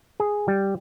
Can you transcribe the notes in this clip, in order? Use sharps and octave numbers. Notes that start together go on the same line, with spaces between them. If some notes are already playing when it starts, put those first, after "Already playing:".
G#4
G3